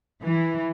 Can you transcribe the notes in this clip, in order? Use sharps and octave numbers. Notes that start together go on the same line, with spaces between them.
E3